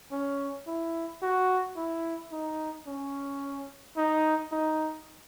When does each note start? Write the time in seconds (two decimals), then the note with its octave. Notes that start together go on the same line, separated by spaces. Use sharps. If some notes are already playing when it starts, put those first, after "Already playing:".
0.12 C#4
0.67 E4
1.23 F#4
1.77 E4
2.32 D#4
2.87 C#4
3.97 D#4
4.52 D#4